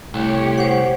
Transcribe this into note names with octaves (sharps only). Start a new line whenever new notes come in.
C2 A2 G4 C#5
C5 F#5